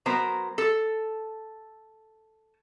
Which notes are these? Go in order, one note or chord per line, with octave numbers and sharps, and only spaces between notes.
F#3 B3 A#4 C5 A#5
A4